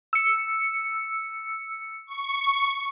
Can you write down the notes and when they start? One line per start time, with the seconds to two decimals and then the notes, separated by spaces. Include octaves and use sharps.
0.13 E6 C#7
2.07 C#6